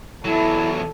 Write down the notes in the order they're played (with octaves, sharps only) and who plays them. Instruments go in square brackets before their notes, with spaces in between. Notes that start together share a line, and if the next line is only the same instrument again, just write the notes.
[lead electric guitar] E2 F#3 [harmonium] E4 [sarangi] A4